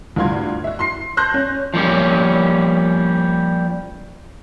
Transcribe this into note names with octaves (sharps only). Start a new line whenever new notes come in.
D2 G2 F4 C6 G#6
F#4 E5
C6 C7
A5 C6 F#6 G6 A#6
C#4
F3 G3 A#3 C#4